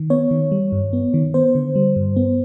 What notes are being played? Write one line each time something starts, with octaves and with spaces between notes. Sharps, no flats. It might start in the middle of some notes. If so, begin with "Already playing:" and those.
Already playing: D#3
B3 C#5
D#3
G3
G2
B3
D#3
B3 C5
D3
G3
G2
B3